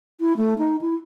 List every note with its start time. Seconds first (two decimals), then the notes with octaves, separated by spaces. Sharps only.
0.20 E4
0.37 A3
0.58 D#4
0.81 E4